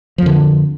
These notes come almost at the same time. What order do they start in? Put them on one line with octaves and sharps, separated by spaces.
F3 F2 D3